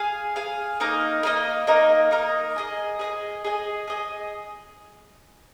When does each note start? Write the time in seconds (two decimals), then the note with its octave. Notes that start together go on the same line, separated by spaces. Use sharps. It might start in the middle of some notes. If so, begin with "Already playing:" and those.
Already playing: G#4 F5 G#5
0.36 G#4 F5 G#5
0.80 A#3 D#4 A#4 D#5
1.23 A#3 D#4 A#4 D#5
1.67 A#3 D#4 A#4 D#5
2.11 A#3 D#4 A#4 D#5
2.56 G#4 D#5 G#5
2.99 G#4 D#5 G#5
3.44 G#4 D#5 G#5
3.88 G#4 D#5 G#5